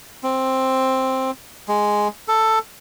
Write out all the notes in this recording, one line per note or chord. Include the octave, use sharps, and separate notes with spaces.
C4
G#3
A4